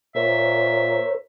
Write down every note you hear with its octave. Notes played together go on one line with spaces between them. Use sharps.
A#2 A#4 C5 C#5 E5